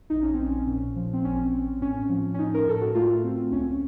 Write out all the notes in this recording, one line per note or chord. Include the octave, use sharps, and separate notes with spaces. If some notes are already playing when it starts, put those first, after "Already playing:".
A#1 D#4
C#4
A#1 C4
C#4
A#2
F3
C4
A1 C#4
C4
A2 C#4
F3
C#4
A2 D#4
A#4
A2 A4
F#4
A3 F4
C4
C#2 C#4